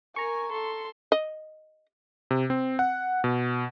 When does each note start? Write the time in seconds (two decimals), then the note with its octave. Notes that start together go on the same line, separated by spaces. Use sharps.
0.16 A#4 G#5 A#5 C#6
0.52 A4 C6
1.12 D#5
2.31 C3
2.50 C4
2.79 F#5
3.24 B2